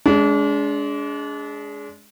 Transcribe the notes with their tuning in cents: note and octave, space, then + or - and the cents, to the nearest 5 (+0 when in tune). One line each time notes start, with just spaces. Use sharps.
G#3 +10 D4 -35